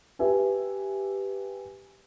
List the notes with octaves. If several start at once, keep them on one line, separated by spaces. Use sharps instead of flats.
G4 B4 E5 G#5